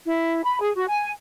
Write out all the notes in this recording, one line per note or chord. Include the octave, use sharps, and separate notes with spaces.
E4
B5
G#4
F#4
G#5